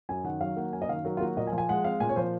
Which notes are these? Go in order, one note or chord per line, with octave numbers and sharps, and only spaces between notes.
F#2 G#5
D#3 F#5
F#3 F5
A#3 F#5
F#2 G#5
D#5
D#3 F5
F#3 A#4
F4
A#3 F#4
A#2 D#5
G#5
F3
G#5
G#3 F#5
C4 F5
A#2 G#5
C#5
F3 C5